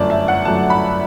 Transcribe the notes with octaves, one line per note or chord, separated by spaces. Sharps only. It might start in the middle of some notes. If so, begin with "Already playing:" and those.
Already playing: G1 F#2 F#3 A3 D5 A5
E5
F#5
G1 F#2 F#3 A3 A5
B5